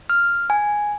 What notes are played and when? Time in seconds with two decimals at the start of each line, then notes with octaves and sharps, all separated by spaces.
0.10 F6
0.50 G#5